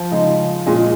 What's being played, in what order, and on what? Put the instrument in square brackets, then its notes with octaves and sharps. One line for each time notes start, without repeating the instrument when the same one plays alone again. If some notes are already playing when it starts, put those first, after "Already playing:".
Already playing: [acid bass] F3
[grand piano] C#3 G#3 D#4 G#4
A#2 G#3 C#4 G#4 D#5